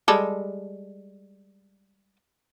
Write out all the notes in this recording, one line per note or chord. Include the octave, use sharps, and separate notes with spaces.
G3 G#3 A4